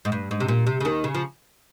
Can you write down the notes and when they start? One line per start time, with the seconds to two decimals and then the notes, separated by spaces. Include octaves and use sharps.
0.05 G#2
0.12 G2
0.31 G#2
0.40 C3
0.48 A#2
0.67 C3
0.80 C#3
0.85 D#2 D#3
1.04 C#3
1.15 F3